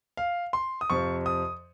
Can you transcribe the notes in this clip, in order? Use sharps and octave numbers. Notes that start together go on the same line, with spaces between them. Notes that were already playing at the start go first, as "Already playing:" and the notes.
F5
C6
D#6
F2 C3 F3 C#6
D#6